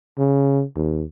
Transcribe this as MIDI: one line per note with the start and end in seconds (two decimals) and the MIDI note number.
0.18 0.64 49
0.76 1.03 39